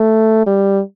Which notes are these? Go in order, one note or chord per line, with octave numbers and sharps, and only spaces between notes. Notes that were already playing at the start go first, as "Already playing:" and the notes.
Already playing: A3
G3